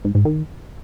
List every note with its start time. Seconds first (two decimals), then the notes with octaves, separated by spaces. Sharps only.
0.05 G#2
0.15 G#2
0.25 D#3